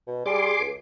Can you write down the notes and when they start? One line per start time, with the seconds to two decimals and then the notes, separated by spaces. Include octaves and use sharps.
0.07 B2
0.26 G3 G#4 C6 D6
0.60 C#2